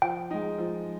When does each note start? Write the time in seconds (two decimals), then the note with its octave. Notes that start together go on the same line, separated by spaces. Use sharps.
0.02 F3 G5
0.31 G#3 D#4
0.58 F3